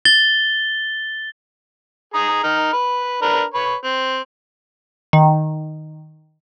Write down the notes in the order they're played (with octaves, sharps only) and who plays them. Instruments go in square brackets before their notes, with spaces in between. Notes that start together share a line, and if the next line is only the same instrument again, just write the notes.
[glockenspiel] A6 G7
[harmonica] G#4 A#5 D#6
D#4 F6
B4
D4 A#4 B4
B4 C#5
C4
[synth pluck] D#3